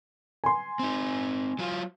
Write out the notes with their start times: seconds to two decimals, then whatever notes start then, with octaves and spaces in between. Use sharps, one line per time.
0.44 G#5 C6
0.79 C4 D#4
1.59 F#3 F4